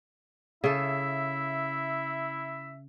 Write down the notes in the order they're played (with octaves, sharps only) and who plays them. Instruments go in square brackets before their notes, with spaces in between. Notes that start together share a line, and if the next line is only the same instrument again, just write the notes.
[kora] C#3 A4 [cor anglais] E4 [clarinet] E5